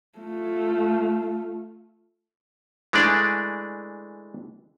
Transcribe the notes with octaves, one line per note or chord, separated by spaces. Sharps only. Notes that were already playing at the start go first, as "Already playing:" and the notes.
A3 F4
E3 G#3 A3 D4 D5